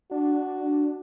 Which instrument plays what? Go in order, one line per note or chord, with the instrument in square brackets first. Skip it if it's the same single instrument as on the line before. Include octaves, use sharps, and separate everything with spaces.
[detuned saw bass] D4 [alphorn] F#4